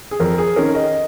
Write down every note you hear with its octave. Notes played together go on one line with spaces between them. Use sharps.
G#4
F2 A#4
G#4
D#3 C#4 A#4
D#5